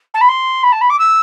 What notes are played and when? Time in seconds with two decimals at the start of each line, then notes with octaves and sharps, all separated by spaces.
0.14 A5
0.21 B5
0.29 C6
0.63 B5
0.72 A5
0.81 B5
0.90 D6
0.99 E6